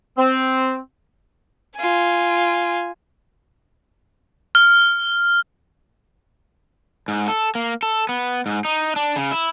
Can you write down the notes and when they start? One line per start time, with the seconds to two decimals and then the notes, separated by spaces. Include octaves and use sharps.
0.18 C4
1.77 F4 G#5
4.55 F6
7.08 G#2
7.28 A4
7.55 A#3
7.83 A4
8.09 B3
8.46 G#2
8.65 D#4
8.96 D4
9.16 C#3
9.31 E4